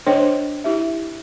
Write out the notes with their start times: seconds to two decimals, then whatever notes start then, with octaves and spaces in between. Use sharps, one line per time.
0.07 D4 A4 C5 C#5 D#5 G5
0.64 E4 G4 E5